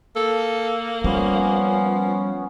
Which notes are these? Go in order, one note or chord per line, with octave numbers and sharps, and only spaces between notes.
A#3 A4
F3 G3 B3 C#4